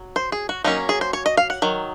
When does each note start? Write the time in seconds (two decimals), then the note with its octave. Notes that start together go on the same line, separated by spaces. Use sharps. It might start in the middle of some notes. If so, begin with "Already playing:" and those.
Already playing: F#3
0.16 C5
0.32 G#4
0.49 F#4
0.64 F#3 A#3 C#4 D#4
0.89 G#4
1.01 C5
1.13 C#5
1.26 D#5
1.37 F5
1.50 F#5
1.62 D#3 F#3